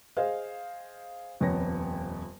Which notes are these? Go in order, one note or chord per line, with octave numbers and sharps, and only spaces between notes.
G#4 C5 D#5 F5
D#1 F2 B3 C#5 A#6